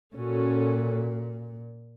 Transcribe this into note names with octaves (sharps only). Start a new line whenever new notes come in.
A#2 C#4 F#4 A4